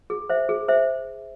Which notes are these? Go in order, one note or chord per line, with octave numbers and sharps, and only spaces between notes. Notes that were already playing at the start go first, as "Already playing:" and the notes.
G#4
C5 E5
G#4
C5 E5